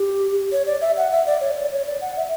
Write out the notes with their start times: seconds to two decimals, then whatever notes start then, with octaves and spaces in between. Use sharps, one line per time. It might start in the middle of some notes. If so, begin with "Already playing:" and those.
Already playing: G4
0.52 C#5
0.66 D5
0.81 E5
0.97 F#5
1.11 E5
1.27 D5
1.41 C#5
1.57 D5
1.72 C#5
1.86 D5
2.01 F#5
2.17 E5